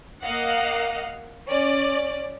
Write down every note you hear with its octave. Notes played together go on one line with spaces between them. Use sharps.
A#3 D#5 F5 F#5
C#4 D5